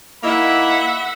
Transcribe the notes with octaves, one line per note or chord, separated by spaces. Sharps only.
A#3 D#4 E4 E5 F#5 B5